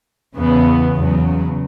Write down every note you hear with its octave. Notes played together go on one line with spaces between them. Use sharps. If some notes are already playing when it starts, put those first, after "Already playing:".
E2 C#3 E3 B3
E2 C#3 F#3